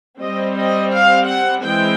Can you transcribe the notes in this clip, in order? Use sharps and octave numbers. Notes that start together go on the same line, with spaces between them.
G3 C4 D#5
D#5
F5
F#5
E3 G#3 C4 G5